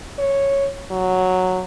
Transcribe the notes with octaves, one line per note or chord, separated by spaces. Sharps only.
C#5
F#3